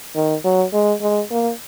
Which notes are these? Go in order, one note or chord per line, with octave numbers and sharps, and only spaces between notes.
D#3
F#3
G#3
G#3
A#3